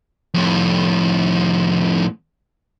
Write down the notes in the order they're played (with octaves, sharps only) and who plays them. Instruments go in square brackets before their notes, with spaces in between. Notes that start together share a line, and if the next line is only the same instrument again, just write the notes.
[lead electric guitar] F2 A2